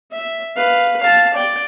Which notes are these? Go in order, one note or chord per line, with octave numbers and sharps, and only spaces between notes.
E5
B4 F5
F5 A5
D5 G5